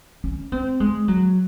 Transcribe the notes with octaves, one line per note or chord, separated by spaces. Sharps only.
C#4
C4
G#3
F#3